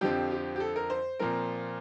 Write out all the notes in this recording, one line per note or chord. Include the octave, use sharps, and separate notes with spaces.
F2 D3 F3 C4 G4
G4
G4
A4
A#4
C5
A#2 F3 C4 A#4